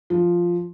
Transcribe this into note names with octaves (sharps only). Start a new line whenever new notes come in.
F3